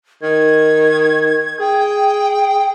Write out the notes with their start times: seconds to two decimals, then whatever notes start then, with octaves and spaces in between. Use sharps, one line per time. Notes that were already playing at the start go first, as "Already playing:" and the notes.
0.23 D#3 G#6
1.60 G#4 G5